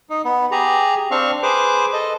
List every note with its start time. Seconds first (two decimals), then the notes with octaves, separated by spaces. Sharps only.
0.10 D#4
0.25 B3
0.52 G4 G#4 A#5
1.11 C4 D4 F5 C#6
1.43 G#4 B4 C5 D6
1.93 A4 D#5